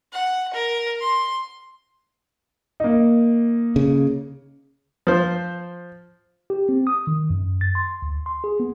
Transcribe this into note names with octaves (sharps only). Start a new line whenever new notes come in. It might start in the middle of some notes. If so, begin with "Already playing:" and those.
F#5
A#4
C6
A#3 D#4
C#3
F3 C5
G4
C4
D#6
D#3
F#2
A6
C6
D2
C6
G#4
B3